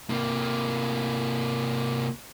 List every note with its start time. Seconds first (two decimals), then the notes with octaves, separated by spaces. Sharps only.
0.10 C3 A#3